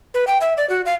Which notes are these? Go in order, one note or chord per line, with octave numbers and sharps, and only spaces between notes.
B4
G5
E5
D5
F#4
F5